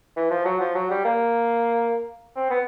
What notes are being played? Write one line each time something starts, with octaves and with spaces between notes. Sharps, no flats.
E3
F3
F#3
F3
F#3
G3
A#3
C4
B3